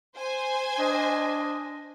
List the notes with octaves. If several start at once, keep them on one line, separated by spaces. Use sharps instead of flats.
C5 G#5
D4 D#5